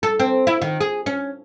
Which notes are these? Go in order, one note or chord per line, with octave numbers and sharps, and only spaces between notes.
A4
C4
E4
D#3
G#4
C#4